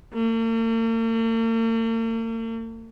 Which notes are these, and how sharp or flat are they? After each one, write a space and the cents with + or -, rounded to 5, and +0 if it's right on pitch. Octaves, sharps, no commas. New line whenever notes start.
A#3 -45